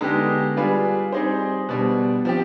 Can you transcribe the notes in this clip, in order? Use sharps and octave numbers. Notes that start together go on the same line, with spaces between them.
D3 G#3 B3 D#4 G4
G3 D4 F4 G#4 B4
G3 C4 D#4 G#4 C5
B2 G3 D4
F3 C4 G4